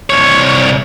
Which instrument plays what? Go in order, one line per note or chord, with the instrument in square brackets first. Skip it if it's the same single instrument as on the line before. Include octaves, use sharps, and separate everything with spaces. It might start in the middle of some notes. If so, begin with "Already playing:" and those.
[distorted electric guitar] C2 C#5